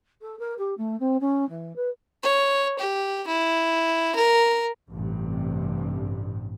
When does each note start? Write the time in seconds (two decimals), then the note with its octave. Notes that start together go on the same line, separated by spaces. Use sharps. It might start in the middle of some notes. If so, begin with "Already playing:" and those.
0.21 A4
0.39 A#4
0.58 G4
0.77 A3
1.00 C4
1.21 C#4
1.49 E3
1.76 B4
2.23 C#5
2.79 G4
3.27 E4
4.15 A#4
4.91 A1 G2 C3